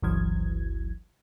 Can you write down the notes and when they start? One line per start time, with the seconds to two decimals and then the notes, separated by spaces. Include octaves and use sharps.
0.02 G1 C#2 E3 F#3 G#6